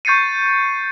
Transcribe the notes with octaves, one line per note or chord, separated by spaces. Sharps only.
C#6 G6 A6 C7 C#7 D#7